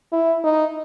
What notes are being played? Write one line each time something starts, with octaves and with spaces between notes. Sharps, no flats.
E4
D#4